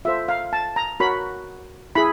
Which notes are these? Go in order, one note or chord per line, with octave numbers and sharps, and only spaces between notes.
F4 A4 C5 E5
F5
A5
A#5
F#4 A#4 C#5 B5
E4 G#4 B5